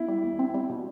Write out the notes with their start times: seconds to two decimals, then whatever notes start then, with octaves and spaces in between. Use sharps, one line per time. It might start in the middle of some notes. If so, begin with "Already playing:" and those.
Already playing: B3 E4
0.08 G3
0.23 E2
0.39 C4
0.54 G3
0.70 B2